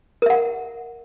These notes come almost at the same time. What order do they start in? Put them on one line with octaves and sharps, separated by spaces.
A#4 E5 F#5